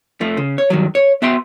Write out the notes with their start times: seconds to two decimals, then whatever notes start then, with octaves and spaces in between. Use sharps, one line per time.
0.21 F2 F3 A3
0.37 C#3
0.58 C#5
0.70 G2 D#3 F#3
0.95 C#5
1.22 B3 F#4 E5 G5 C6